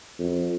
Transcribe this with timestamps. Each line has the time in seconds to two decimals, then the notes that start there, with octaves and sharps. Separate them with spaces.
0.19 F2